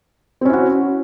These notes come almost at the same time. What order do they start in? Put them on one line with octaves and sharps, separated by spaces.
C4 C#4 E4 F#4